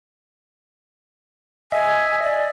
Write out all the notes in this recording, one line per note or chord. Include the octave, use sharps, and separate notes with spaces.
D#5 E5 G#5
D5